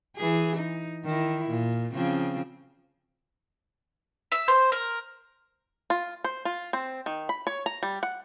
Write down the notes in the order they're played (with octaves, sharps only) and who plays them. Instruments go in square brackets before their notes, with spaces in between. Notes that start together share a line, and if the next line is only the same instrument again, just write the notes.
[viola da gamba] E3 G#4
D#4
D#3 E4
A#2
C#3 F3 C4
[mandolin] E5
C5
A#4
[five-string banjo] F4
C5
F4
C4
D#3
B5
C#5
A#5
G3
F#5